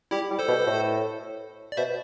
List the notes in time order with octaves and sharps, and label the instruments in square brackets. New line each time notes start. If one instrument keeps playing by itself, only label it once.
[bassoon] G3 [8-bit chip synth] E4 G4
[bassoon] G3
[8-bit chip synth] A4 C5
[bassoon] B2
A2
[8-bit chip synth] D5
[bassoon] B2 [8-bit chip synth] C5 E5